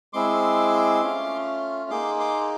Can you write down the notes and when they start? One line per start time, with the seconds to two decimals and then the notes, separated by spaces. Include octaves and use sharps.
0.13 G#3 C4 E4 G#4 C6 D6
1.02 A3 C#4 F4
1.90 A#3 D#4 G#4 C6 D6
2.20 C6 D6